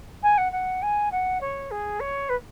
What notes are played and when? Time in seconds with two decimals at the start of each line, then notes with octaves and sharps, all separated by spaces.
0.23 G#5
0.38 F#5
0.52 F#5
0.82 G#5
1.12 F#5
1.41 C#5
1.71 G#4
2.00 C#5
2.29 B4